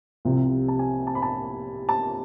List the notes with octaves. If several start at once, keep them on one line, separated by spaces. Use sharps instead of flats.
C2 C3 F3
A5
G#5
A5
B5
A5
A5